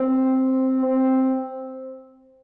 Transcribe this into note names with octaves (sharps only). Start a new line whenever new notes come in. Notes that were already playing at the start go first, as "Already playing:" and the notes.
Already playing: C4
C4